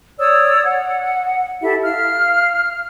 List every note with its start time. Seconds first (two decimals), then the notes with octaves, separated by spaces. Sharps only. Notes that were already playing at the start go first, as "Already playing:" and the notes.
0.19 C#5 D5 D#6 E6
0.65 F#5
1.62 E4 G4 A4 E5
1.82 F5 F6